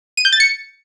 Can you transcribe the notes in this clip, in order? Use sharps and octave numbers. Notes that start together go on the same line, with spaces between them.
D#7
G6
A6
C#7